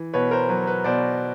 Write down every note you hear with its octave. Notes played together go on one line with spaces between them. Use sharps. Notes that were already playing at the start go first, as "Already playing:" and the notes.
Already playing: E3
B2 B4 C#5
A#4 C5
F#3 B4
B4
B2 C5 D5